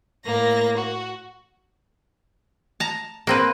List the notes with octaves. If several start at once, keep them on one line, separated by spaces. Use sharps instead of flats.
A2 A#3 A#6
F#4
A5 A#5
A#3 C4 B4